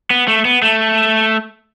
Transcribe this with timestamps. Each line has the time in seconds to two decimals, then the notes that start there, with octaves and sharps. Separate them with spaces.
0.10 B3
0.28 A3
0.45 B3
0.62 A3